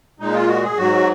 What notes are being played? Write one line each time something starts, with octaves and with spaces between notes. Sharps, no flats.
A#2 G#3 D#4
F4
F#4
G#4
G#2 F#3 F#4